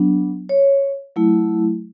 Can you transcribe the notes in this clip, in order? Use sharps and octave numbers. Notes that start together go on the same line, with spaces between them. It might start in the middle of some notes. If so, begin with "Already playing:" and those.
Already playing: F#3 B3 D4
C#5
F#3 A3 E4